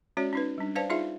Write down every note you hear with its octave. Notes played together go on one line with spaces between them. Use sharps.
G#3 C#4 F#4 C#5 D5
C#4 D#4 B4
G3 D4
B4 C5 D5 F5 A5
D#4 F4 G#4 E5 F5